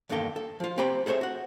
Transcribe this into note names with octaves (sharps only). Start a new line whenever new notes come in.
E2 G2 D#3 A#3 A4 G5
A4
F3 F4
C4 G4 C5 G5 A#5 B5
G#4 A4 C5 C#5 E5
F#4 F#5